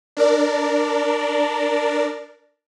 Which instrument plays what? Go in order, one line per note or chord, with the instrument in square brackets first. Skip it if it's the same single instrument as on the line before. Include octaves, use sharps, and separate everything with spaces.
[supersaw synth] D4 A#4 D5